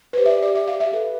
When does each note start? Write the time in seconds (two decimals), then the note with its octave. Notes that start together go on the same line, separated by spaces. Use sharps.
0.13 B4
0.17 G4 C5
0.26 E5
0.30 D5
0.43 D5
0.55 E5
0.68 F5
0.80 E5
0.93 A4 B4